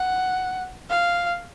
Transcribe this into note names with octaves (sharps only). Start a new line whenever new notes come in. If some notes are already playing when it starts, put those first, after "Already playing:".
Already playing: F#5
F5